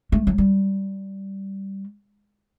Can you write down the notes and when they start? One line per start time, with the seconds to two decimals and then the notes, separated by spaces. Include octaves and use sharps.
0.12 A3
0.27 F#3
0.38 G3